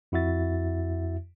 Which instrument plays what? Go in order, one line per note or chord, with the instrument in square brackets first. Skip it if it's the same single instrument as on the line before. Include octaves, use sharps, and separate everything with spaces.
[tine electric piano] F2 E4 F#4 E5 A6